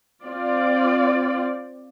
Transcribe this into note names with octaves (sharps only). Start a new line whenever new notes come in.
C4 F4 D5